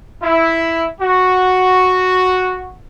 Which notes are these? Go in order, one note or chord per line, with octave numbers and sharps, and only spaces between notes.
E4
F#4